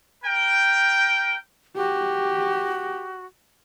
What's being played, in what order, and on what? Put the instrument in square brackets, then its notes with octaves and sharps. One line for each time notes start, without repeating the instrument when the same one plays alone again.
[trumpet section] A#4 G5
[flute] F#4 [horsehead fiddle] G4